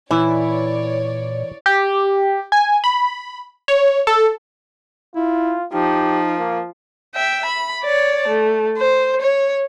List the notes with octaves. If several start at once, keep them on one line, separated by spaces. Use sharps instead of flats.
A#2 E3 E4 C#5 D5
G4
G#5
B5
C#5
A4
E4 F4
F3 D#4 G4
A#3
E5 G5
B5
C#5 D5
A3
C5
C#5